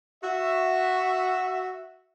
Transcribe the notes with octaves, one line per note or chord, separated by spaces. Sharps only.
F#4 E5